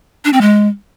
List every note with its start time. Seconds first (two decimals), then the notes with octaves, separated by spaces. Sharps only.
0.25 D4
0.33 C4
0.41 G#3